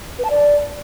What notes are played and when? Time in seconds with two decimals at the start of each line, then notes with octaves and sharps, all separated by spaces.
0.19 B4
0.25 A5
0.30 D5